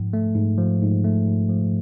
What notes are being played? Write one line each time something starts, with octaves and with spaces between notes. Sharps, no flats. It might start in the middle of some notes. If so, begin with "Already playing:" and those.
Already playing: G#2 F3
A3
G#2
F3
G#2
A3
G#2
F3